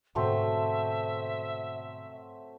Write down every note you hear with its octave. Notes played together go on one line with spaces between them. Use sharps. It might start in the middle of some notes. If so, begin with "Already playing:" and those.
G#2 B2 D3 F#3 A3 C4 E5